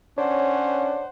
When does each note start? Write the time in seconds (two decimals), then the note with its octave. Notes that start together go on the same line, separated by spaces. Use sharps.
0.18 C#4 D4 C5 C#5 F#5